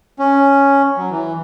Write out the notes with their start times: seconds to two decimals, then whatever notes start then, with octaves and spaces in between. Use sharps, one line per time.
0.19 C#4
0.97 F#3
1.11 E3